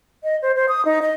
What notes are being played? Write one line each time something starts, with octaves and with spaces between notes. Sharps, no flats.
D#5
C5
C5
D#6
D#4
D#5